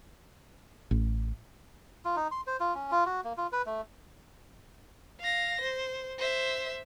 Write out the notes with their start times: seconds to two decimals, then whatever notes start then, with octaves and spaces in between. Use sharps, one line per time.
0.91 A1
2.05 F4
2.16 D#4
2.31 C6
2.47 C5
2.60 F4
2.75 C#4
2.92 F4
3.06 F#4
3.24 A#3
3.37 F4
3.52 B4
3.66 A3
5.20 F5 A#6
5.60 C5
6.19 C5 E5